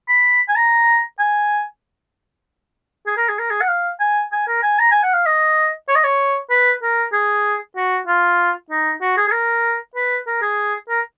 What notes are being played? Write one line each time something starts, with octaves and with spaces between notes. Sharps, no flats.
B5
G#5
A#5
G#5
G#4
A#4
G#4
A#4
G#4
F#5
F5
G#5
G#5
A#4
G#5
A#5
G#5
F#5
F5
D#5
C#5
D#5
C#5
B4
A#4
G#4
F#4
F4
D#4
F#4
G#4
G#4
A#4
B4
A#4
G#4
A#4